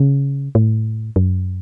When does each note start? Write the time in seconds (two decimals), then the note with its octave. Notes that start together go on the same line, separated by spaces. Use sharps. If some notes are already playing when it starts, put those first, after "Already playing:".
Already playing: C#3
0.55 A2
1.16 F#2